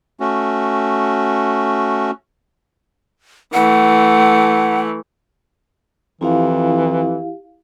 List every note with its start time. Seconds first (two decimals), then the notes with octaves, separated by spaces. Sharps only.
0.20 A3 C#4 F#4
3.54 E3 A3 F#5
6.21 F2 E3 E4 G4 F5